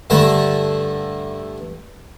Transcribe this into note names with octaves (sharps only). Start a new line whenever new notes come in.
G2 D3 A3 A5 A#5